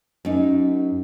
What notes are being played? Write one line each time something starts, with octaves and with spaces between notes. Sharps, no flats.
F#2 D#4